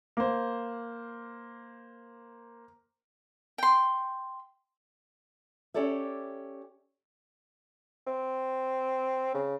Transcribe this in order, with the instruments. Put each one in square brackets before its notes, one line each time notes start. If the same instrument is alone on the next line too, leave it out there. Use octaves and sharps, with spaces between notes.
[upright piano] A#3 C5
[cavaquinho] G5 C6
[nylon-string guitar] C#4 G4 A4 D5 E5
[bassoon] C4
C#3